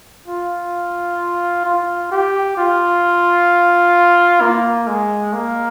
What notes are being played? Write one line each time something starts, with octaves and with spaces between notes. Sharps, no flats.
F4
F4
G4
F4
A#3
G#3
A#3